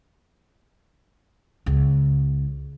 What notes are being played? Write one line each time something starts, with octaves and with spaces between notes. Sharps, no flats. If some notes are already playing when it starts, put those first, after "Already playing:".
C#2